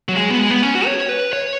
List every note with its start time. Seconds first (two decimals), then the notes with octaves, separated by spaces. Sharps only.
0.09 F#3
0.16 G#3
0.30 B3
0.39 G#3
0.51 B3
0.62 C#4
0.75 F#4
0.86 C#5
1.09 B4
1.33 C#5